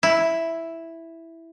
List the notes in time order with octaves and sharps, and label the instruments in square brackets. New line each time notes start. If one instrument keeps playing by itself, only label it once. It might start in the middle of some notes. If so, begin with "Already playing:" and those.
[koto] E4